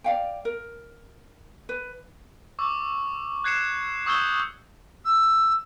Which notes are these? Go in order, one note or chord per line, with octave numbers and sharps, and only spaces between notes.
D5 F5 G5
A#4
B4
C#6 D6 E6
F#6 G#6 C7 C#7 E7
C#6 D#6 E6 G6 G#6 G7
E6